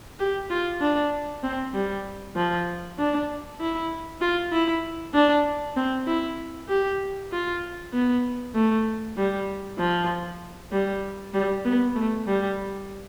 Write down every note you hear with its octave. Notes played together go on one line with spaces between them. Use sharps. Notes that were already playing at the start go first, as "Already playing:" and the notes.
G4
F4
D4
C4
G3
F3
D4
E4
F4
E4
D4
C4
E4
G4
F4
B3
A3
G3
F3
G3
G3
B3
A3
G3